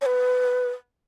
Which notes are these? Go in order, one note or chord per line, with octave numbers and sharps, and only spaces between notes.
C#5
B4